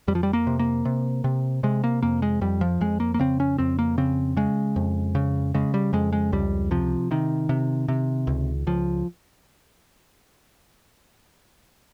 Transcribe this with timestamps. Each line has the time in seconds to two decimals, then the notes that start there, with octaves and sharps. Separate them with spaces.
0.08 F2 G3
0.15 F3
0.23 G3
0.33 A#3
0.47 C3
0.59 A#3
0.85 C3
1.24 C3
1.63 C3 G#3
1.84 A#3
2.03 F2 A#3
2.22 G#3
2.41 F2 G3
2.61 F3
2.81 F2 G#3
3.00 A#3
3.14 A#3
3.19 C#3 C4
3.40 C#4
3.58 F2 C4
3.79 A#3
3.98 C#3 C4
4.37 C#3 G#3
4.76 F2
5.15 C#3
5.54 C#3 G#3
5.74 G3
5.93 F2 G#3
6.13 G#3
6.32 C#2 G3
6.71 C3 F3
7.11 C3 D#3
7.49 C3
7.88 C3
8.27 C#2
8.67 C#2 F3